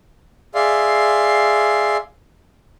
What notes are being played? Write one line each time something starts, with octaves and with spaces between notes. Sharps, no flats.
G#4 D5 E5 F5 C6